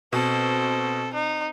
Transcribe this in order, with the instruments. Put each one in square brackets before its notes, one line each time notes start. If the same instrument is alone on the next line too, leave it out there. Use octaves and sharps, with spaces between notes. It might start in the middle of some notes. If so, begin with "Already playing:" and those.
[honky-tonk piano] B2 [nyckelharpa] C4 C5 [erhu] A4
[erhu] D#4